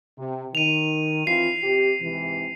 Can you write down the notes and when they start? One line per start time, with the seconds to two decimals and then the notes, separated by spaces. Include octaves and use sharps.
0.19 C3
0.55 D#3 D#7 F7
1.27 E3 C4 F4 C7
1.63 C3 G4
2.02 G#2 C3 E3